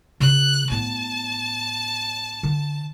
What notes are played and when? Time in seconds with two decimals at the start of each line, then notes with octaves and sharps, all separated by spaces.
0.20 C#3 F4 F#6
0.70 A2 B3 A5
2.43 D3